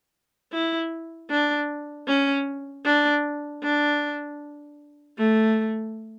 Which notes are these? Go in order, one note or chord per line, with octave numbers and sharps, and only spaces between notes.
E4
D4
C#4
D4
D4
A3